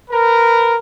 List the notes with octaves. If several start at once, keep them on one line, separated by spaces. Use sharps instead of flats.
A#4 B4